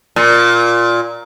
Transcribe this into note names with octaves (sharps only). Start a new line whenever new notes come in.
A#2